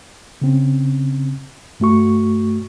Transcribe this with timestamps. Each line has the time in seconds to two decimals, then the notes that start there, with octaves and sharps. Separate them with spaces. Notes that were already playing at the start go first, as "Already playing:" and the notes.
0.42 C#3 C4 C#4
1.80 G2 A3 F#4 C#6